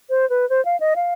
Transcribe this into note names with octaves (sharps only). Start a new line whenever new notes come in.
C5
B4
C5
F5
D#5
F5